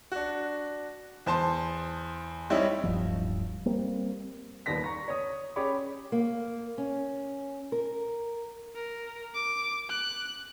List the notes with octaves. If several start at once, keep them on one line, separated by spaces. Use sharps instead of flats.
D4 F#4
E2 C5 A5 C6
G3 C4 D#4 E4 C#5
D1 G2 F3
G3 A#3 C4
D#1 D#2 B3 A#6 B6
A#5 C#6 A#6
C#5 D#6
C#4 G4 G#4 C#5 B5 D6
A#3
C#4
A#4
A#4
D6
F#6